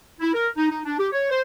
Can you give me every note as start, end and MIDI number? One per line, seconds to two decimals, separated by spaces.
0.20 0.31 64
0.34 0.47 70
0.56 0.68 63
0.71 0.80 63
0.85 0.98 62
0.99 1.07 67
1.12 1.28 73
1.30 1.40 72